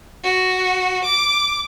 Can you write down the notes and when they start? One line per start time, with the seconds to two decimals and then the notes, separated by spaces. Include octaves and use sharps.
0.24 F#4
1.05 D6